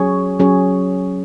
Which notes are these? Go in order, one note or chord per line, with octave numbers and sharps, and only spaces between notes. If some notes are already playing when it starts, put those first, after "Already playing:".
Already playing: F#3 C#4 G#4 C#5
F#3 C#4 G#4 C#5